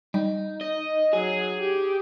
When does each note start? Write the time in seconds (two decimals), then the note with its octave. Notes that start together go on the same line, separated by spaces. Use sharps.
0.14 G3 D#4
0.61 D#5
1.13 F#3 G#4
1.58 G4